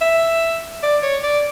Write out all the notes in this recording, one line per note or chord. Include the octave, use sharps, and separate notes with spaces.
E5
D5
C#5
D5